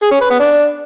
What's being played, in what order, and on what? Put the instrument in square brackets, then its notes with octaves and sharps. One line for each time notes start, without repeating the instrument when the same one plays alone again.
[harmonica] G#4
C#4
B4
B3
D4